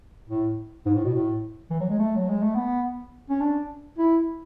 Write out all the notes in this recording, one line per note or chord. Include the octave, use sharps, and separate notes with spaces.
A2
G#2
A2
B2
A2
E3
F#3
G#3
A3
F#3
G#3
A3
B3
C#4
D4
E4